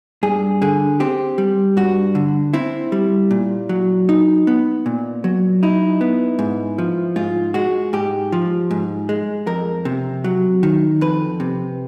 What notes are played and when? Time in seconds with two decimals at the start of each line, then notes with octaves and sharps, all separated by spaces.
0.23 G2 G#4
0.62 D3 G#4
1.00 C4 G4
1.38 G3
1.77 G2 F#4
2.15 D3
2.54 C4 E4
2.92 G3
3.31 A#2
3.69 F#3
4.09 D#4
4.47 B3
4.86 A#2
5.24 F#3
5.63 D#4 E4
6.01 B3
6.39 G#2
6.78 F3
7.16 G#2 F4
7.54 G#3 F#4
7.93 G#2 G4
8.32 F3
8.71 G#2
9.09 G#3
9.47 F2 A#4
9.85 C3
10.24 F#3
10.63 D#3
11.01 F2 B4
11.40 C3